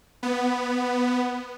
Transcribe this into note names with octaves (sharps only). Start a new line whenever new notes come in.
B3